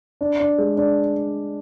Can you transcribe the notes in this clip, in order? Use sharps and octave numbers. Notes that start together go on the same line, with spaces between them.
D4
D4
G#3
D4